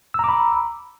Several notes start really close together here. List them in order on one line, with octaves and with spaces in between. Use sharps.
E6 A#5 D6 B5